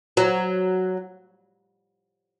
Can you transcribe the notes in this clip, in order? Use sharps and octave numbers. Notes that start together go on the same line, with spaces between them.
F#3